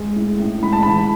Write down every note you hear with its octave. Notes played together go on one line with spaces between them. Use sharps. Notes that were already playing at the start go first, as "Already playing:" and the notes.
Already playing: G#3
A2
A2
G#3 B5
A5
E3 B5